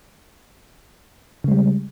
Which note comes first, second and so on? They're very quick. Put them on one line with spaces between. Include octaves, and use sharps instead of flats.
C#3 G#3 G3